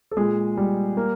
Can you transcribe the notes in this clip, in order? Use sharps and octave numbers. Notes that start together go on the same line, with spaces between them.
A4
A#2 G#3 G#4
G3
A#3